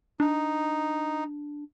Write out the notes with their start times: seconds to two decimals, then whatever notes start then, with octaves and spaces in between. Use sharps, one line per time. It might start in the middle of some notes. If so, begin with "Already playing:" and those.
0.20 D4 D#4